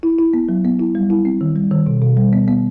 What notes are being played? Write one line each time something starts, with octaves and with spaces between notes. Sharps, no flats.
E4
E4
B3
F#3
B3
E4
G3
E4
C4
D#3
G3
D#3
B2
B2
G3
B3
B3